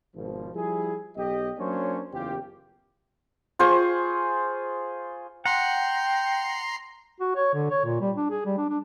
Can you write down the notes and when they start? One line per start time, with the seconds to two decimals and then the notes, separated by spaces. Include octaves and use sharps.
0.15 G#1 B2 F3
0.54 F3 G3 E4 G#4
1.16 B1 G4 D#5
1.58 F#3 A#3 C#4 D4 C5 C#5
2.11 F#1 E2 C#4 F4 G4
3.59 F4 G#4 C5 C#6
5.46 F#5 G5 A#5 C6 C7
7.20 F#4
7.36 C#5
7.54 D3
7.71 C#5
7.85 A#2
8.01 G3
8.16 D4
8.30 G#4
8.45 G3
8.57 D4
8.70 D4